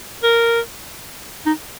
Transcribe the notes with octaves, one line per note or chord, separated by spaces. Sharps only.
A#4
D#4